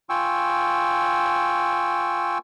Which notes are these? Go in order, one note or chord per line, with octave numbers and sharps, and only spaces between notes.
F4 G5 G#5 C#6 E6